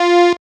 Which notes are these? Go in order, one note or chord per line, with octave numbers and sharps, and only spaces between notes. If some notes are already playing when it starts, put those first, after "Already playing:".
Already playing: F4